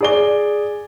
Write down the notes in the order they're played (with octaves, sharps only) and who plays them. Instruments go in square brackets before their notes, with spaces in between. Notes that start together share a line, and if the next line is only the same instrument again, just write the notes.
[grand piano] G#4 D5 G7